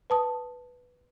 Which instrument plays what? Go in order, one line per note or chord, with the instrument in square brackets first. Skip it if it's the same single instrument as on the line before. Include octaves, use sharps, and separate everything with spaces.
[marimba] B4 A5 D#6